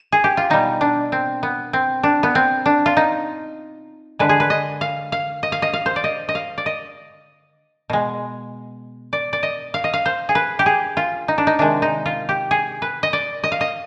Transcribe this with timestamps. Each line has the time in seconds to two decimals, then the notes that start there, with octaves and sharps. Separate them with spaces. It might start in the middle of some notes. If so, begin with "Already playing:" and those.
Already playing: B4
0.12 G#4
0.24 G4
0.37 F4
0.50 B2 G3 D#4
0.81 D4
1.12 C4
1.43 B3
1.73 C4
2.03 D4
2.23 B3
2.35 C4
2.66 D4
2.86 F4
2.97 D#4
4.19 D3 G#3 B4
4.29 G#4
4.40 B4
4.50 D#5
4.81 F5
5.12 F5
5.43 D#5
5.52 F5
5.62 D#5
5.73 F5
5.86 C5
5.96 D5
6.04 D#5
6.29 D#5
6.35 F5
6.58 D5
6.66 D#5
7.90 B2 G#3
9.13 D5
9.33 D5
9.43 D#5
9.74 F5
9.84 D#5
9.93 F5
10.06 C5
10.29 G#4
10.35 B4
10.59 G4
10.66 G#4
10.97 F4
11.28 D#4
11.38 D4
11.47 D#4
11.59 C3 D#3 G#3 D4
11.82 D#4
12.06 F4
12.29 G4
12.51 G#4
12.82 B4
13.03 D#5
13.13 D5
13.44 D#5
13.52 F5
13.61 D#5